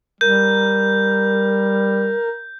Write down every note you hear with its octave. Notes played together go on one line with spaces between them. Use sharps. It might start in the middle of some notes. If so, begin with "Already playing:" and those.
G3 A#4 G6